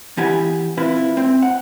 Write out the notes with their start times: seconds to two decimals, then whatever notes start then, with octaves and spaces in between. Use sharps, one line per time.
0.17 E3 B3 G4 F#5 G#5
0.77 C4 E4 F4 B4
1.17 C4
1.43 F#5